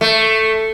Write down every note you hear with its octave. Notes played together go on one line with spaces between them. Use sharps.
A3